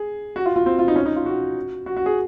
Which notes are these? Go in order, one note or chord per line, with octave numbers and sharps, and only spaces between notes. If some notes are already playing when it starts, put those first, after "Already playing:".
Already playing: G#4
F#4
F4
F4
C4
F4
D#4
C#4
D#4
F4
F#4
F#4
F#4
G#4